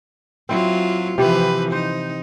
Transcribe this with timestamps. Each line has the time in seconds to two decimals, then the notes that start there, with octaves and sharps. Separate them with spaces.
0.49 F#3 C4 E4 F4
1.18 C3 E3 F3 G4 B4
1.72 D#4 C5